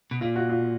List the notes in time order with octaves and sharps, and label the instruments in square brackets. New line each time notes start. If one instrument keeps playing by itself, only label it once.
[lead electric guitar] B2
[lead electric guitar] A#2 [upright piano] F4
[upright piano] F#4
F4